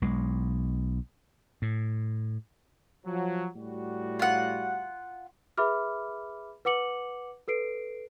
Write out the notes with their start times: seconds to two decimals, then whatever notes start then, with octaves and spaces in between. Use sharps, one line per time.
0.02 B1 G#3
1.62 A2
3.06 F3 F#3
3.55 A2 G3 F#4
4.19 F4 F#5
5.58 G#4 B4 E5 B5 D6 F6
6.65 B4 F#5 D6 C#7 F#7
7.48 A4 B4 C7 D7